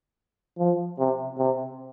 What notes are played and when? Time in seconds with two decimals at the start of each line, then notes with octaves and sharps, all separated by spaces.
0.58 F3
0.99 C3
1.38 C3